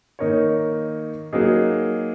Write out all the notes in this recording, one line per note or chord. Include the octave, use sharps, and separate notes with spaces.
D#3 A#3 D#4 A#4 C#5
F#3 A#3 D#4 G#4